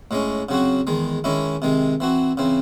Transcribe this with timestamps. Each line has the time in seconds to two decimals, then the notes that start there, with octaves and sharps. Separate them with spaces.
0.11 A2 G#3 C#4
0.49 C#3 F#3 C4 F#4
0.87 E2 D#3 G#3
1.24 D#3 G#3 C#4 E4
1.62 C3 D#3 G#3
2.00 E3 C4 F#4
2.37 C#3 E3 C4